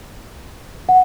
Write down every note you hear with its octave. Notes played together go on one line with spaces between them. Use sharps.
F#5